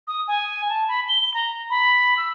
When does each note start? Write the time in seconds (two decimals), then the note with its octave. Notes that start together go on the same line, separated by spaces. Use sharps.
0.07 D#6
0.28 G#5
0.69 A5
0.88 B5
1.09 G7
1.34 A#5
1.70 B5
2.17 E6